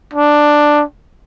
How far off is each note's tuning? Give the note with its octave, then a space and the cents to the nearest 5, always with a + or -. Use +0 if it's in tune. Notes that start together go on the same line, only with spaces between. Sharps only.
D4 +5